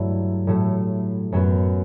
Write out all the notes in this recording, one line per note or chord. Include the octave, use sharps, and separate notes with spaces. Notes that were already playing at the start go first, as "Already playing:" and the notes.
Already playing: G2 F#3 A3 E4
A2 F#3 A3
F#2 F#3 B3